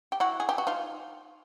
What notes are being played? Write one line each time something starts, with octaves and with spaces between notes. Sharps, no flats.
G4
E4 F#4
G#4
G4
F#4
D#4 F4